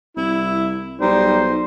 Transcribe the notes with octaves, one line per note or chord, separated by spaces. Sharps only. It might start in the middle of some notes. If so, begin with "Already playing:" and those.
C2 E4
B1 G3 D#4 C5